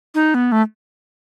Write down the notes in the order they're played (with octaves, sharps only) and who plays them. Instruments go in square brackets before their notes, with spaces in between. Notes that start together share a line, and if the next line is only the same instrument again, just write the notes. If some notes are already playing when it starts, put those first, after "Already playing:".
[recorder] D#4
B3
A3